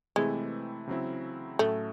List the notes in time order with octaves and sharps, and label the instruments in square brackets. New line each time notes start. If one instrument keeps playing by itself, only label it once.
[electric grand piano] C3 E3 A3 C4 E4 [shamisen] G#3
[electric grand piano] C#3 F#3 C4 E4
[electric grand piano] A2 F#3 C#4 E4 [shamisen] A3